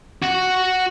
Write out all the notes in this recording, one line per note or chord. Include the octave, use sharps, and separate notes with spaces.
F#4 F#5